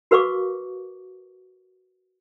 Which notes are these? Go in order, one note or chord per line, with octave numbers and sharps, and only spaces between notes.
F#4 A#4 B4 F5 C#6 D6